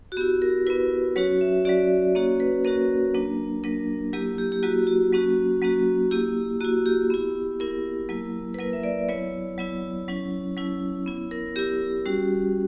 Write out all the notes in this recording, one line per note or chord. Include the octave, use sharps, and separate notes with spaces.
F#4
B3 E4 G4
A#4
B3 E4 B4
F#3 C#4 F#4 C#5
E5
F#3 C#4 F#4 D5
A#3 C#4 F#4 C#5
B4
A#3 C#4 F#4 A#4
F#3 A#3 D4
F#3 A#3 D4 A#4
F#3 A#3 E4 G4
G4
G4
F#3 A#3 E4 F#4
F#4
F#3 A#3 C#4 F#4
F#3 A#3 C#4 F#4
A#3 E4 G4
A#3 E4 F#4
G4
B3 E4
B3 E4 A#4
F#3 A#3 E4
B4
F#3 A#3 E4 A#4
E5
D5
F#3 B3 E4 C#5
F#3 B3 E4
F#3 C#4 E4
F#3 C#4 E4
B3 E4
A#4
B3 E4 G4
G3 C#4 F#4